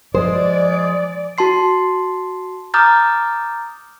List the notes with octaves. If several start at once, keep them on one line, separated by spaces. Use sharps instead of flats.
F3 G#3 G#4 C5 D5
F#4 A5 C6 C7
A#5 D6 D#6 F6 G6 A6